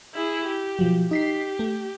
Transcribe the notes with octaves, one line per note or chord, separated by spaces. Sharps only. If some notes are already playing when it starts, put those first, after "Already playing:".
E4 G#4
G4
B2 F3 F#3
D#4 G4 B6 C7
A3